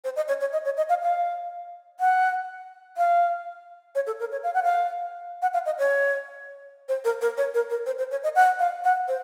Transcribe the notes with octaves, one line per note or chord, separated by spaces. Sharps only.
C5
D#5
C#5
C#5
D#5
C#5
D#5
F5
F5
F#5
F5
C#5
A4
A#4
C#5
F5
F#5
F5
F#5
F5
D#5
C#5
C5
A#4
A#4
C#5
A#4
A#4
C5
C5
C#5
D#5
F#5
F5
F#5
C5